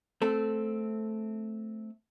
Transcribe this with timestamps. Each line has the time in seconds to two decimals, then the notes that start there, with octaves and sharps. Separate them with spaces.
0.22 A3 C4 A4